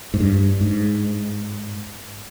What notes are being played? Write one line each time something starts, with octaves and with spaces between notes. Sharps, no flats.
G#2
G2
G#2